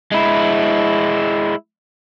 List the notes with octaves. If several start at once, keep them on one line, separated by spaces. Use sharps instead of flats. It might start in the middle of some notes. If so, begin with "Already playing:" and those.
G#3 E4